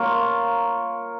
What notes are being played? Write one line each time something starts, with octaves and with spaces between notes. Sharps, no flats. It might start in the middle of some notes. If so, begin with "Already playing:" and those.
Already playing: A#3 F4 A#4 C#5